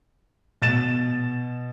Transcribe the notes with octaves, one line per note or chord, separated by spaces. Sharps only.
B2 A6 E7